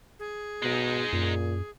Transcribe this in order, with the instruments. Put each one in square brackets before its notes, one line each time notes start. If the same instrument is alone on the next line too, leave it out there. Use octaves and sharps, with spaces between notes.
[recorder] G#4
[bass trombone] B2 [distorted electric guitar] G#3 D#4
[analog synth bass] F#2 [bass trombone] A#2